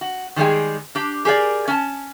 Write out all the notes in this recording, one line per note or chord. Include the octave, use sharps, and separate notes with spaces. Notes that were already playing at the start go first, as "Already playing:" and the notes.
F#4
D#3 G3 G#3 G#4 G5
D4 G4
G4 G#4 A#4 D5
C#4 A5